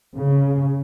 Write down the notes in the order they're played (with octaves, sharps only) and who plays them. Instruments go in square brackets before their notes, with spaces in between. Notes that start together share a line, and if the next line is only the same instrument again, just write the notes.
[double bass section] C#3